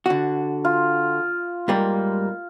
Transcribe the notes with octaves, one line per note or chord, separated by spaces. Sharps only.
D3 F#4
F4
G#2 G3 A#3